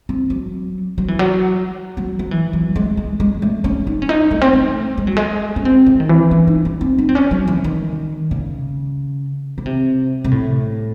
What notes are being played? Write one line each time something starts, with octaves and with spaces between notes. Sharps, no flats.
C4
F#3
F#3
E3
F#3
F#3
F#3
E3
F#3
G#3
G#3
G#3
A3
C#4
D#4
C#4
D#4
A3
C4
A3
G#3
F#3
G#3
C#4
C4
E3
D#3
E3
C#4
D#4
C#4
C4
D#4
C4
C#4
F#3
E3
D#3
C#3
C#3
C3
C3
A2